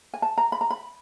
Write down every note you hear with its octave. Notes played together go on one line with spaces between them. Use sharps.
G#5
A5
A#5
B5
A#5
B5